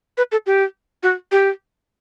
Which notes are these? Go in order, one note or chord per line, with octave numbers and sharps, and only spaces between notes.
B4
A4
G4
F#4
G4